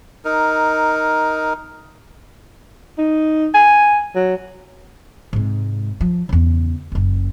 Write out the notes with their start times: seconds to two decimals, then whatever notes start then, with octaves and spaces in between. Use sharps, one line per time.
0.25 D#4 A#4
2.98 D#4
3.54 G#5
4.15 F#3
5.33 G#2 C3
6.00 F3
6.29 E2 C#3
6.92 F#1 C#4